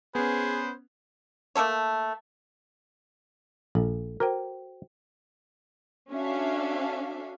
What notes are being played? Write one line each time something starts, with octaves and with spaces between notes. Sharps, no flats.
B3 C#4 G#4 B4 C5
A3 A#3 A4 C#5
A#1 A4
F#4 A#4 C5 G5
C#4 D4 F#4 A4 E5 F5